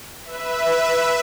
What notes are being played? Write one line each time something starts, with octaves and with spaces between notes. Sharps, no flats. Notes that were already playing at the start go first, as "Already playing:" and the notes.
B4 E5